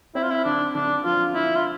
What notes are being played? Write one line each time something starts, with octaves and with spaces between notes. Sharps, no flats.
C4 E4
F4
E4
D3 D4
D3 D4
F3 F4
D3 E4
F4